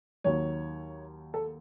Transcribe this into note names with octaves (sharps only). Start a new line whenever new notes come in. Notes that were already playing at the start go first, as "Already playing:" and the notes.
D#2 D#3 F#3 C#5
A4